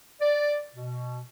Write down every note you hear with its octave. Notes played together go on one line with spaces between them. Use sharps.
D5
B2